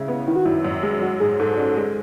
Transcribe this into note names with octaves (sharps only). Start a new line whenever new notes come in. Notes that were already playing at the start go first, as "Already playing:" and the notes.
Already playing: C#3 G#3 E4
B3
D#3 E4
F#4
F#2 E4
F#2
G#3
F#3 F#4
G#2 G#4
G#2 A4
C#4
G#3